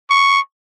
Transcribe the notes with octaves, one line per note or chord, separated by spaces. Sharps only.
C#6